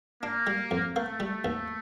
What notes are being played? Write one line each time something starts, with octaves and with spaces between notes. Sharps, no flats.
A#3 D4
G3
F2
A3 A#3
G3
D#2